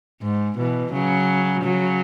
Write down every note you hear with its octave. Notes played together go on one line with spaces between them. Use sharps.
G#2
B2 E3
C#3 F#3
C#3 F#3